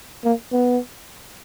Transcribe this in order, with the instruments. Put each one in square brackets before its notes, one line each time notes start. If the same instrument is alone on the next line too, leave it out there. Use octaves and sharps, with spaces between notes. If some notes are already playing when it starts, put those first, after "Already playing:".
[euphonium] A#3
B3